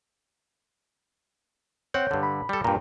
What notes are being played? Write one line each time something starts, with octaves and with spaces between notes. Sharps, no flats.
C4 C#5 F#5 G6
G2 D3
B5
G3 A4
G2 A#2 G5 A#5